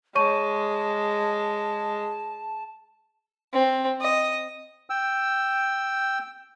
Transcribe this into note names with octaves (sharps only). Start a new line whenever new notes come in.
G#3 C#5 A5 C#6 D#7
C4
D#5
G5 E6